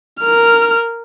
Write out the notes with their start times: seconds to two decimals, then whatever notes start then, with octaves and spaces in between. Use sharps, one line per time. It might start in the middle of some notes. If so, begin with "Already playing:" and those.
0.21 A#4 F6